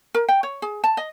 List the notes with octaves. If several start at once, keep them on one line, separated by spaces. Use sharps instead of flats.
A#4
G5
C#5
G#4
A5
D#5